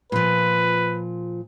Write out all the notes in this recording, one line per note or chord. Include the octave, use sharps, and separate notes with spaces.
A#2 F3 B4